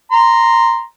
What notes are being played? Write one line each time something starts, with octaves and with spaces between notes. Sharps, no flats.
A#5 C6